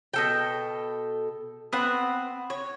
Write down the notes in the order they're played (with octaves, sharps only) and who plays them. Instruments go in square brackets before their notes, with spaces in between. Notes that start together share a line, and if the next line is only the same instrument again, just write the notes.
[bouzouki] B2 A4 G5
B3 C4 F#5
C#5